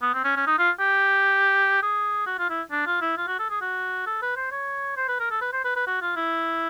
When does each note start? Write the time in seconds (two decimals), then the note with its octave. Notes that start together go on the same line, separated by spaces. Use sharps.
0.02 B3
0.14 C4
0.24 C#4
0.36 C#4
0.47 D#4
0.59 F4
0.80 G4
1.82 G#4
2.26 F#4
2.39 F4
2.50 E4
2.71 D4
2.86 F4
3.01 E4
3.17 F4
3.27 F#4
3.39 A4
3.50 G#4
3.61 F#4
4.07 A4
4.22 B4
4.36 C5
4.52 C#5
4.97 C5
5.08 B4
5.20 A#4
5.31 A4
5.41 B4
5.53 C5
5.65 B4
5.76 B4
5.87 F#4
6.02 F4
6.16 E4